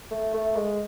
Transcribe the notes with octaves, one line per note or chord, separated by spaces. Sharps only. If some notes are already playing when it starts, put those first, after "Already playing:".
A3
A3
G#3